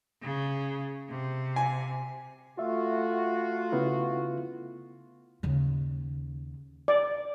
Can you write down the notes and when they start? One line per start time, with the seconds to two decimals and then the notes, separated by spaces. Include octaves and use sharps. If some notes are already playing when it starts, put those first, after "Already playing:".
0.22 C#3
1.09 C3
1.56 G#5
2.59 A3 F4 F#4 E5
3.72 C#3 B3 E4
5.43 D#2 C#3
6.88 D5